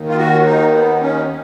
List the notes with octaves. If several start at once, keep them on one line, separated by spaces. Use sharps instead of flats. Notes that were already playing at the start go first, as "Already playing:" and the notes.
Already playing: D#2 D#3
F4
F#4
D#4
B3
C#4